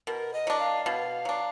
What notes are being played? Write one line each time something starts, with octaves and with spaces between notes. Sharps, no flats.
B2 A#4
D#5
F#3 D4
F5
B2 F5
F#3 D4